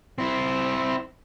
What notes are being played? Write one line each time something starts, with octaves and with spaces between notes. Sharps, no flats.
C4 E4